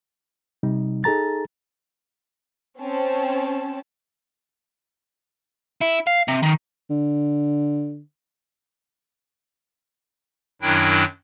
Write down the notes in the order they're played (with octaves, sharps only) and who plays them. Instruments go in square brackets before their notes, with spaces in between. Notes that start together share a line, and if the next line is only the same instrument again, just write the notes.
[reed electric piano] C3 G3 D#4
D#4 G#4 A4 A#5 A6
[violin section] C4 C#4 A5
[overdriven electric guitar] E4
F5
C3
D#3
[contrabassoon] D3
[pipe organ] F#2 D#3 F#3 D4 E4 G5